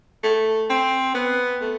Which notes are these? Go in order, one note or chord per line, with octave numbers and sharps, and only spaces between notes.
A3
C4
B3
A3